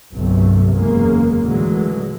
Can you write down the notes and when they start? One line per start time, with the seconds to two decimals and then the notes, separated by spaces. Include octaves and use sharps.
0.13 G1 C2 G2 C3 F#3 A3
0.76 F#1 E2 G#3 A#3 C#4
1.42 A#2 D3 E3 F#3 G#3 A3